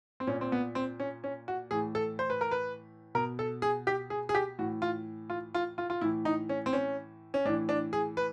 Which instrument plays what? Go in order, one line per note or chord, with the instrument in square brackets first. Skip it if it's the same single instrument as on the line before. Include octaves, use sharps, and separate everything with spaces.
[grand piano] C4
A#2 C#4
C4
B3
C4
C#4
C#4
F#4
A2 E3 G#4
A4
C5
B4
A#4
B4
B2 A#4
A4
G#4
G4
G#4
G#4
G4
A2 E3 F#4
F4
F4
F4
F4
F4
A2 E3 E4
D#4
C#4
C4
C#4
C#4
A2 D4
E3
D4
G#4
B4